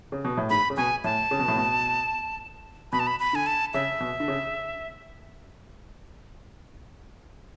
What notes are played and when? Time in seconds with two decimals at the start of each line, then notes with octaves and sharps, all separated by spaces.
0.12 C#3
0.25 B2
0.37 A2
0.50 G#2 B5
0.70 C#3
0.77 B2 G#5
1.04 A2 A5
1.31 C#3
1.39 B2
1.48 A2
1.56 B2
2.92 B2 B5
3.00 A5
3.07 B5
3.20 B5
3.33 D3 G#5
3.46 A5
3.74 C#3 E5
4.00 B2
4.20 D3
4.28 C#3